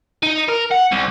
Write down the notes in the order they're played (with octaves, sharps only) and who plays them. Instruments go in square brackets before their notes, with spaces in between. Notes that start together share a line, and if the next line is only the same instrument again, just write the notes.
[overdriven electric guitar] D#4
A#4
F#5
C2